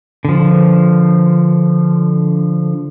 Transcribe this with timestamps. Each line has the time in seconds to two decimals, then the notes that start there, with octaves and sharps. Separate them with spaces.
0.25 D3 F3